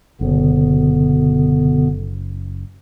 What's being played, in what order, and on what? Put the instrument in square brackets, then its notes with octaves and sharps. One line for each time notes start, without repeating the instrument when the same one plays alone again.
[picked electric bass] F#1 [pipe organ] B2 D3 B3